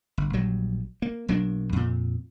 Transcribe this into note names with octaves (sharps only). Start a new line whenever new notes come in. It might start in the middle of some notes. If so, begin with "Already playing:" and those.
G1
A#1 F#3 G3
A#3
B1 F#3 A#3 D4
F2 A#2